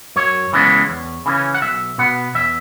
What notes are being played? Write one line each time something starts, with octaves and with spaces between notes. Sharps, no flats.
F#2 C#5
C#3 E3 G#3 B3
E2
C#3 E3 C#4
F#5
B1 E5
B2 B3 F#5
E2 E5